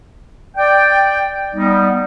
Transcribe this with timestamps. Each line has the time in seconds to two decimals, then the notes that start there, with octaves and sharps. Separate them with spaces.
0.57 D5 G5
1.55 G3 B3 D#4